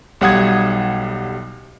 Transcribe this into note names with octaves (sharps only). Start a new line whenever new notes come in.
B1 G3 F#5 D#6 G#6